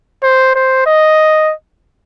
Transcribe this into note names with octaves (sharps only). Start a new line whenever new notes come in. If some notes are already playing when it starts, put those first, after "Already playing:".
C5
C5
D#5